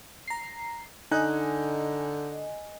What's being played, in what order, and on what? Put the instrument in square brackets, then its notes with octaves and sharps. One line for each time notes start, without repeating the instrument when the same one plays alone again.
[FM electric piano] A#5 C7
[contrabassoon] D3 [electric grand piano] D#4 F#6 [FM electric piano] D#5 G#5